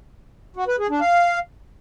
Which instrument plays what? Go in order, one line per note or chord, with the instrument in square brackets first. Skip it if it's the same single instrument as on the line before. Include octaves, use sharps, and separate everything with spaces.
[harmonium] F#4
B4
G#4
D4
F5